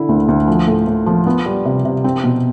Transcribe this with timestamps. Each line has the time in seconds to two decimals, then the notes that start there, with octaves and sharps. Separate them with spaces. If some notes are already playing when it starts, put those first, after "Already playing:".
Already playing: D3 E4
0.09 D2
0.28 D2
0.48 F3
0.68 A2
0.87 A2
1.06 F3
1.26 B3
1.46 G3
1.65 C3
1.85 C3
2.04 C4
2.24 B2